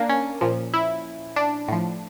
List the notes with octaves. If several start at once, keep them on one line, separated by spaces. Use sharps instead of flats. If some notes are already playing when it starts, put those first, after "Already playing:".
Already playing: A#3 D4
C#4
A#2 F3
E4
D4
A2 F3